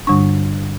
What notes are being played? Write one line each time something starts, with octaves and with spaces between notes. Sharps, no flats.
G2 D3 G3 D4 C#6